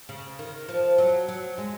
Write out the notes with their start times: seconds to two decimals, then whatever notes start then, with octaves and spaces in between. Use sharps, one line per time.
0.09 C#3
0.39 D#3
0.68 F3
0.98 F#3
1.28 F#3
1.58 G#3